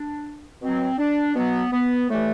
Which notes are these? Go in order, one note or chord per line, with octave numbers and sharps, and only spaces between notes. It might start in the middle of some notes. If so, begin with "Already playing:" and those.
Already playing: D4
B2 F#3 C4
D4
B2 F#3 B3
B3
A2 E3 G3 A3